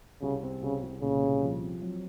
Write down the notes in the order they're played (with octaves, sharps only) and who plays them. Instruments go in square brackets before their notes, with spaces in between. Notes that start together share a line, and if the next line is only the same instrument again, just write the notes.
[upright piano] C2 [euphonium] C#3
[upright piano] C4
[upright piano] C2 [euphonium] C#3
[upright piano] C2
[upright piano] A#2 [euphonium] C#3
[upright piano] C2
F3
C4
F#3